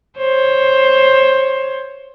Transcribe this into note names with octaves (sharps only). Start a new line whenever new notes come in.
C5 C#5